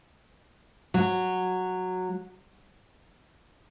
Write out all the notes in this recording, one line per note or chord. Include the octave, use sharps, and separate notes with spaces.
F#3